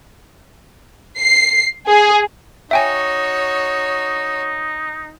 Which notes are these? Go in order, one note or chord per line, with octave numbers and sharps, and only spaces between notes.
C7
G#4
D#4 F#4 C#5 E5 G5 G#5